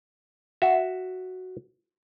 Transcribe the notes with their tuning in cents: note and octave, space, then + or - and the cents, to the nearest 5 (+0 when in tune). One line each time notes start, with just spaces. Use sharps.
F#4 +0 E5 +0